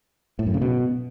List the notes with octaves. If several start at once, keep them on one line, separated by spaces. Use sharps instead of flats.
A2
F#2
C#3
B2